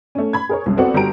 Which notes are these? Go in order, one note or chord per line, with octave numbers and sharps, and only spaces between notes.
A3 C#4
B5 G#6
G#4 A#4 C#5
C2 F#2
B3 C4 F#4 A4 D5 F#5
G1 F#4 G4 A#5 D7